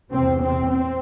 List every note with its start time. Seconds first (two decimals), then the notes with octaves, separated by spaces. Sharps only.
0.11 E2 C3 C4
0.41 C4
0.71 C4